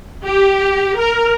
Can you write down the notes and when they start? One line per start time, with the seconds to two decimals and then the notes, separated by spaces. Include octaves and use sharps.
0.25 G4
0.97 A#4